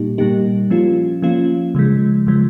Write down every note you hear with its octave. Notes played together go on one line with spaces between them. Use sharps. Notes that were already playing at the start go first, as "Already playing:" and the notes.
Already playing: A#2 G3 A#3 D#4 G4
A#2 G3 A#3 D#4 G4
F3 A#3 C#4 F4
F3 A#3 C#4 F4
C#3 F3 G#3
C#3 F3 G#3